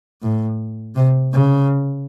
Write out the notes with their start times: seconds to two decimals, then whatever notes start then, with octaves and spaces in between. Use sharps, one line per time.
0.22 A2
0.95 C3
1.33 C#3